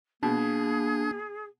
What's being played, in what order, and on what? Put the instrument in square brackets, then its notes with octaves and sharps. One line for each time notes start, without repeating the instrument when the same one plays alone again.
[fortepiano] B2 [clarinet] A#3 [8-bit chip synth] D4 [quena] G#4